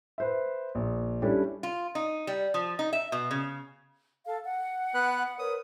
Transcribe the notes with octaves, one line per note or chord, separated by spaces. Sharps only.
B4 C5 E5
A#1
G3 C#4 D4 E4 G4 A4
F4
D#4
G3
F3
D#4
E5
B2
C#3
A4 F5 A5
F#5
B3 B4 F#6
A#4 B4 C#5 D#6